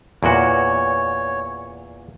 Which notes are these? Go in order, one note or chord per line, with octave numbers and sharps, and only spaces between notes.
E2 A#2 F#4 C#5